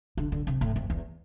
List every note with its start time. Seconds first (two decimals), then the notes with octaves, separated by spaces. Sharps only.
0.17 D3
0.32 D3
0.47 C3
0.61 A2
0.76 F2
0.90 E2